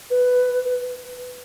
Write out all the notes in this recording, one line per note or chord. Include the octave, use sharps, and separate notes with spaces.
B4